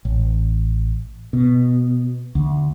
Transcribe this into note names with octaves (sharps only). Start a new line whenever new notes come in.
A1
B2
D2